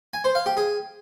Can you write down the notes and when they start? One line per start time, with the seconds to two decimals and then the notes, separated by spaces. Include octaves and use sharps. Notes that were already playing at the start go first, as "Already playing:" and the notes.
0.14 G#5
0.24 C5
0.35 F5
0.46 G4
0.57 G#4